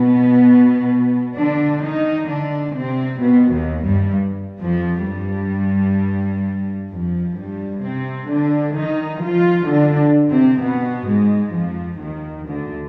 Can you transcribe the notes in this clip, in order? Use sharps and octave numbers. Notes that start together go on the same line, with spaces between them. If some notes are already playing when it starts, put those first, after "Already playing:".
Already playing: B2 B3
D3 D4
D#3 D#4
D3 D4
C3 C4
B2 B3
D#2 D#3
G2 G3
F2 F3
G2 G3
F2 F3
G2 G3
C3 C4
D3 D4
D#3 D#4
F3 F4
D3 D4
C3 C4
B2 B3
G#2 G#3
F2 F3
D#2 D#3
D2 D3